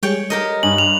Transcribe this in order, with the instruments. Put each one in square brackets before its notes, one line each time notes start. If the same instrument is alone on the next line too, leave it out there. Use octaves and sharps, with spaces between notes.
[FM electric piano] G3 G#3 G#4 [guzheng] C#5 G5
[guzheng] G4 A#4 D#5
[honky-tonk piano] G2 [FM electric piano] G#5 D#6 [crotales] F#7
[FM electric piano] G4 [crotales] F7